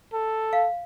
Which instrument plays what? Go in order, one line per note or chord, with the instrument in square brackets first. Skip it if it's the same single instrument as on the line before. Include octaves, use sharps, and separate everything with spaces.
[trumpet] A4
[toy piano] F5